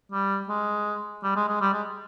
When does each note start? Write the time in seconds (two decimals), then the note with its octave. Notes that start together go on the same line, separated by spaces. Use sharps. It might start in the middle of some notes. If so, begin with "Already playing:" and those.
0.12 G3
0.49 G#3
1.23 G3
1.36 G#3
1.48 G#3
1.61 G3
1.73 G#3